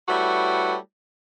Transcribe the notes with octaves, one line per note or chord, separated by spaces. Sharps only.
G3 A3 E4 F#4 B4 C#5